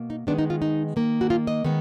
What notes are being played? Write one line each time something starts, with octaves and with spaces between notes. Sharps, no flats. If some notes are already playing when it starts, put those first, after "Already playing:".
Already playing: B2 A#3
D#4
D#3 G#3 B3 D4
D#4
F4
D#4
D#3 A#3
F#4
F4
D#5
D#3 G#3 B3